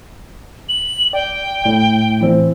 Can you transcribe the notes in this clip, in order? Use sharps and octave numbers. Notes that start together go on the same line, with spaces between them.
F#7
D5 G5
A2
E3 C4